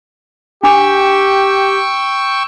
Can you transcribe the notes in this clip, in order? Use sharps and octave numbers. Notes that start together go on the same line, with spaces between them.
D4 G4 G5 C#6 D6 E6